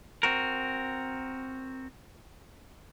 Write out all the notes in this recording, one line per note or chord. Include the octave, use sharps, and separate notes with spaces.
C4 F#4 A#4